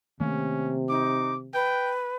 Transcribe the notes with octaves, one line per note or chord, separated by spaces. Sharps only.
C3 D#3 A3 A#3 C#4
D#4 D6
B4 G5